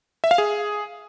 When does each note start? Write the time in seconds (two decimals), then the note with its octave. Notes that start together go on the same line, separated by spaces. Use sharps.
0.24 E5
0.31 F5
0.38 G#4